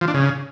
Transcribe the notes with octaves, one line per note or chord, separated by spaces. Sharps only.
F3
D4
C#3